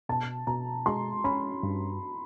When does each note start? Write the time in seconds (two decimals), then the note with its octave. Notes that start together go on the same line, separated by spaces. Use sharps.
0.09 B2 A5
0.47 B2 A#5
0.86 G#3 C6
1.24 C#4 B5
1.63 G2